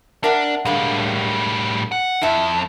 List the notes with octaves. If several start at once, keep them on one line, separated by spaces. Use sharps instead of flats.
D4 A#4 E5 F#5
A2 D3 G3 G#3 A#3
F#5
F2 E4 E5